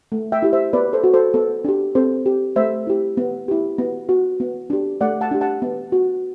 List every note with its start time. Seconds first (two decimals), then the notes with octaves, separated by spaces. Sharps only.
0.12 A3
0.32 E5 G5
0.42 E4 G4
0.53 C5 E5
0.73 B3 B4 D5
0.93 A4 C5
1.04 F#4
1.14 A4 C5
1.34 B3 A4
1.65 D4 G4
1.95 C4 A4 C5
2.26 G4
2.56 A3 C5 E5
2.87 E4 G4
3.17 B3
3.48 E4 G4
3.78 B3
4.09 F#4
4.40 B3
4.70 D4 G4
5.01 A3 D5 F#5
5.21 F#5 A5
5.31 D4 G4
5.41 F#5 A5
5.62 B3
5.92 F#4